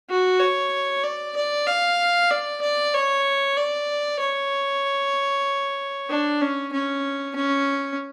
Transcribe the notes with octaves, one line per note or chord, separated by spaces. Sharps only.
F#4
C#5
D5
D5
F5
D5
D5
C#5
D5
C#5
D4
C#4
C#4
C#4